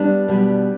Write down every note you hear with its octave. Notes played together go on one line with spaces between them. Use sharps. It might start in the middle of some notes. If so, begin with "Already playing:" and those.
Already playing: G3 B3 D4
B2 G3 B3